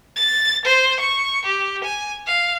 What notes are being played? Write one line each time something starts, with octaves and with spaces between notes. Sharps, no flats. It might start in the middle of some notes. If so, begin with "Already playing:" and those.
A6
C5
C#6
G4
G#5
F5